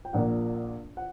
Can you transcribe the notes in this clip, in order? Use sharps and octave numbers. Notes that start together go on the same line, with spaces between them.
G5
A#1 A#2 A#3 F#5
F#5